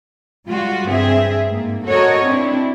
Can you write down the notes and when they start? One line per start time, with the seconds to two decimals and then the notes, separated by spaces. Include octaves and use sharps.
0.48 G3 G#3 F4 F#4
0.88 G2 C4 G#4 E5
1.48 G#2 A#3
1.87 F#4 A4 A#4 C#5 D#5
2.26 C4 D4 E4